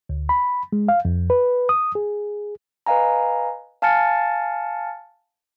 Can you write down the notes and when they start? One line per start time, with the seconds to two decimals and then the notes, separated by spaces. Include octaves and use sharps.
0.09 D2
0.29 B5
0.72 G#3
0.88 F5
1.05 F2
1.30 B4
1.69 D#6
1.95 G#4
2.86 B4 D#5 F5 G#5 A#5
3.82 F5 G#5 A5 F6 A6 C#7